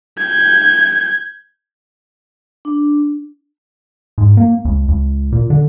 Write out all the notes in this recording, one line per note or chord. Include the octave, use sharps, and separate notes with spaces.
G6 G#6
D4
G#2
A#3
C#2
C#2
A#2
D3